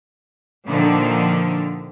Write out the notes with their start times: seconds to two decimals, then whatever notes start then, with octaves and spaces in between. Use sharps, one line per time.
0.67 A#2 D3 D#3 F3